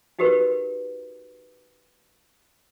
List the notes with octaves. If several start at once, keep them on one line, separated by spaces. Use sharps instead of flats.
D#4 F#4 G4 A#4 B4